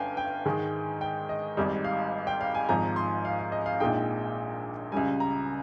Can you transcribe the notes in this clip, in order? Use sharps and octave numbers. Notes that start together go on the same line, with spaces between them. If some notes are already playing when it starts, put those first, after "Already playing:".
Already playing: G1 G2 C#4 F5 G5 G#5
G5
G#2 D#3 G#3
G5
D#5
G#1 G#2 G3 D#5
F5
G5
F5
G#5
G#1 G#2 F3 A#5
C6
F5
F5
D#5
F5
A#1 A#2 G#3 D#4 G5
C#2 C#3 G3 G#5
A#5